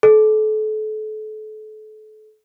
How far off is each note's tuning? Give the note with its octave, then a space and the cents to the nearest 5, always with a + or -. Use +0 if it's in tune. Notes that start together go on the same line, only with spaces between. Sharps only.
A4 -35